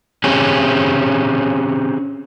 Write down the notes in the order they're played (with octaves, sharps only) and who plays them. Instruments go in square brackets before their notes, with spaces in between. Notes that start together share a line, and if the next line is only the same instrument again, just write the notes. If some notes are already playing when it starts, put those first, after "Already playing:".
[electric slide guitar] C4 C#4 G4 G#4